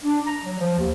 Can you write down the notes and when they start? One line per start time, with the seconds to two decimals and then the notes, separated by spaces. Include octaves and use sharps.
0.04 D4
0.26 A#5
0.43 F#3
0.59 F3
0.78 D#2